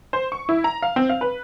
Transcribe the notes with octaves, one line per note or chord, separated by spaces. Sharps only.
C5
C#6
E4
A#5
F5
C4
F5
B4